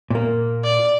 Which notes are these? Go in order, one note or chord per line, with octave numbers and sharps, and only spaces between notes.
A#2 A#3
D5